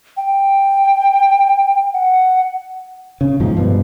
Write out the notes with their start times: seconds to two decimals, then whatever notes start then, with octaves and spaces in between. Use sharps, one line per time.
0.17 G5
1.94 F#5
3.21 C#3
3.40 G#2 B2 D#3 F3
3.57 G2 B2 F3